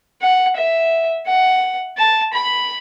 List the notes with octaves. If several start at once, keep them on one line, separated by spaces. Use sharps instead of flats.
F#5
E5
F#5
A5
B5